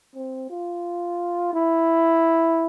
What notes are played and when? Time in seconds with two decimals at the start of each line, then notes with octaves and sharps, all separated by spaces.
0.15 C4
0.49 F4
1.53 E4